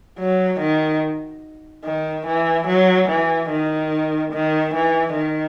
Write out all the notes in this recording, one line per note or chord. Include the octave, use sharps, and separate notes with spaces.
F#3
D#3
D#3
E3
F#3
E3
D#3
D#3
E3
D#3